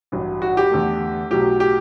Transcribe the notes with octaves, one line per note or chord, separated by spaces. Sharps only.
A1 G2 F#3
F#4
G4
E2 D3 A3
B1 A2 F#3 G4
G4